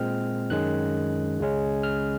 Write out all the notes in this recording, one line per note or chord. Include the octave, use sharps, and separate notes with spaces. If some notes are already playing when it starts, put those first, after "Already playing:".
Already playing: A#2 G#3 C4 F6
F#2 D#3 G#3 C#4 F#6
C#2 C#3 G#3 C#4
F6